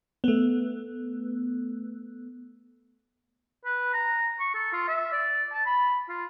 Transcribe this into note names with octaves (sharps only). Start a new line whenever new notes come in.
A3 B3
B4
A#5
C#6
A4
F4
E5
D5
A5
B5
F4